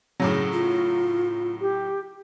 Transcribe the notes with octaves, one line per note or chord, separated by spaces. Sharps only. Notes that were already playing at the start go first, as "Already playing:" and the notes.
A2 C#3 F#3
F4
G4